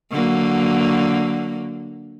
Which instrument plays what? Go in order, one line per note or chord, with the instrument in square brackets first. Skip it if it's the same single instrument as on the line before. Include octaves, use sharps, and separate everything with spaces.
[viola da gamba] D3 F#3 A#3